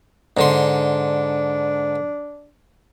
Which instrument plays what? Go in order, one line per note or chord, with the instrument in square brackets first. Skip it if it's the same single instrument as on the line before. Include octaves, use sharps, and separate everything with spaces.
[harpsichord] G#2 D3 C6 [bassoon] D4